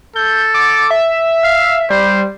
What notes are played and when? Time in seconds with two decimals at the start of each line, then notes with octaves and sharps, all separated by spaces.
0.16 A4 G6
0.54 D6
0.91 E5
1.44 F5
1.90 G3 C5